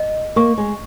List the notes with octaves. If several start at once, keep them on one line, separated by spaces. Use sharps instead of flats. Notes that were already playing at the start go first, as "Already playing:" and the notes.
Already playing: D#5
A#3 C#6
G#3